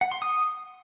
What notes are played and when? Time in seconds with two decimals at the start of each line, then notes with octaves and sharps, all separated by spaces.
0.01 F#5
0.12 C6
0.22 D#6